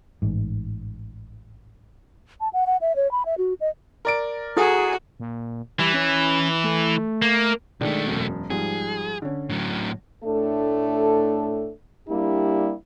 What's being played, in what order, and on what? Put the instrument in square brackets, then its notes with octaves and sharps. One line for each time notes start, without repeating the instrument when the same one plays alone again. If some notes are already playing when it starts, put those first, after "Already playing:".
[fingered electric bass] A1 G#2
[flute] A5
F#5
F#5
E5
C#5
B5
E5
F#4
D#5
[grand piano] A#4 D5 D7
[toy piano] E4 A4 D#6 [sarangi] F#4 [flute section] G#4
[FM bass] A#2
[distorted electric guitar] E3 [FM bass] G3
[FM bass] C#4
A3
[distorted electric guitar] A#3
[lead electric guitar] B1 A3 [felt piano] D#3 G#3 D4
[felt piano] E1 F#2
[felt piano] G#2 F3 G3 [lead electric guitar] G#4
[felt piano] D3 C#4
[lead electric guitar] A2 F#3
[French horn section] A2 A3 D4 A4
G3 A#3 D4 E4 G4